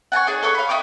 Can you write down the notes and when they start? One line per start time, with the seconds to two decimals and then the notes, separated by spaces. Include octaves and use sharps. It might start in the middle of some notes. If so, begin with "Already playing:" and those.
0.12 F#5 G#5 A5 C#6
0.26 D4 D#4 G#4 C#5
0.43 A4 B4 C#5 C#6
0.55 F5 B5
0.69 D#4 E4 G5 D6